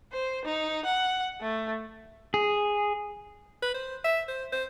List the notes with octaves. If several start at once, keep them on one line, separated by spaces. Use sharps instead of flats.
C5
D#4
F#5
A3
G#4
B4
C5
E5
C5
C5